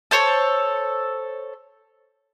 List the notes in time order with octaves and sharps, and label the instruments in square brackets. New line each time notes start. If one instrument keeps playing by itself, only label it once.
[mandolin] A4 C5 C#5